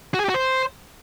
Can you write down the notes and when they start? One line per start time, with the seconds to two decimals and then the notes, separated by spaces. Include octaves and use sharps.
0.14 F#4
0.19 G#4
0.24 G4
0.29 F#4
0.34 C5